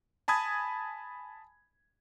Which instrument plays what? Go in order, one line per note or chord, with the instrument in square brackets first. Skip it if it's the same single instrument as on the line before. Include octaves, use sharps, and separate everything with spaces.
[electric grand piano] G#5 A5 B5 D#6 G#6